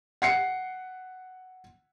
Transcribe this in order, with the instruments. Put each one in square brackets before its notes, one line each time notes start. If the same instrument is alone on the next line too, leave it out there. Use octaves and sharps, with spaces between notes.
[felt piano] F#5 C7 C#7